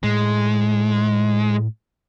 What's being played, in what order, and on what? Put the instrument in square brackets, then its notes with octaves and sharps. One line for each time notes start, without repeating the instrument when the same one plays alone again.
[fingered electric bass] A2 [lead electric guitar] G#3